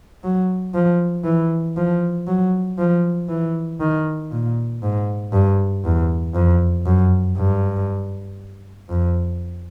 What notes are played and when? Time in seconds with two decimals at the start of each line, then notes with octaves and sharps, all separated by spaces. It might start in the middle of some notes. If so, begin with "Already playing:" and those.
0.24 F#3
0.74 F3
1.25 E3
1.77 F3
2.27 F#3
2.78 F3
3.29 E3
3.80 D#3
4.32 A#2
4.82 G#2
5.33 G2
5.84 E2
6.35 F2
6.86 F#2
7.37 G2
8.89 F2